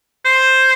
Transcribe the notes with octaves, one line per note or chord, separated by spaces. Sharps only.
C5